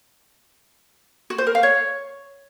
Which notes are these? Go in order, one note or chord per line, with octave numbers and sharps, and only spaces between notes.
F#4
C5
A#4
F5
C#5